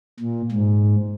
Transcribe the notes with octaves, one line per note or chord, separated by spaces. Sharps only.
A#2
G#2